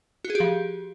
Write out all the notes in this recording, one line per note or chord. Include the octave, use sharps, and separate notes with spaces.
F#4
G#4
G4
F3